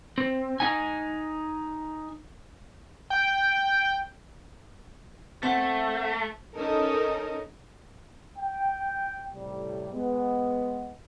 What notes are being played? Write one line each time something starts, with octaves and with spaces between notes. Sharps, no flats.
C4
D#4 G#5
G5
A3 C4 F#5
C#4 D#4 A4 A#4
G5
A2 C3 G3
G#3 B3